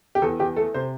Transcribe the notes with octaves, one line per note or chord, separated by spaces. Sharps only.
G4
E2 A4
E2 G4
A3 A4
C3 C5